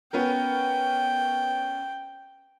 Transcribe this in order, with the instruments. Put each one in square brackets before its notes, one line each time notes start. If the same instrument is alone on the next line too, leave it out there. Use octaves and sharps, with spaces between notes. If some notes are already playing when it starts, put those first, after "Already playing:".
[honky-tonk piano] B3 C#4 A#4 [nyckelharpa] G5